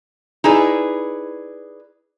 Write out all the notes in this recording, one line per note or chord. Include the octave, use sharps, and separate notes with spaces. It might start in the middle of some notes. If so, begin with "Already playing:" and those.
D#4 E4 G#4 B4 D5